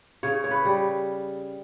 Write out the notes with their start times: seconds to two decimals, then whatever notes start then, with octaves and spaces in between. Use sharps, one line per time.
0.23 C#3 C#5
0.44 C#5
0.51 B4
0.65 G3